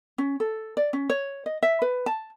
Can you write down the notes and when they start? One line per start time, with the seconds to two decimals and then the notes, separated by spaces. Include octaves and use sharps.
0.18 C#4
0.40 A4
0.77 D5
0.93 C#4
1.10 C#5
1.46 D#5
1.63 E5
1.82 B4
2.06 A5